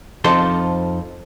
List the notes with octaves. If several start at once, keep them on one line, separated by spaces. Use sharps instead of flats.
F2 F3 D#4 A4 C5 C6